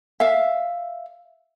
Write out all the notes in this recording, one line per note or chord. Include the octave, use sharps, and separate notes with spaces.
E5 F5